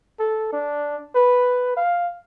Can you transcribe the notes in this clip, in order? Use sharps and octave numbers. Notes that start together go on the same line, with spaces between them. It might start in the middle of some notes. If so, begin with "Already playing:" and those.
A4
D4
B4
F5